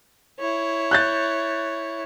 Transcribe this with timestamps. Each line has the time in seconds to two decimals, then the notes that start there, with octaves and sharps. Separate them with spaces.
0.40 E4 C#5
0.91 F#6 G6 A6